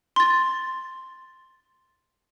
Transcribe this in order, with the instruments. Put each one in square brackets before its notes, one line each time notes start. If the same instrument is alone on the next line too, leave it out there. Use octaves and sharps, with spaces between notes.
[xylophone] C6 A6